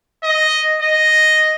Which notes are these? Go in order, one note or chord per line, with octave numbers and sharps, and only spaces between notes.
D#5
D#5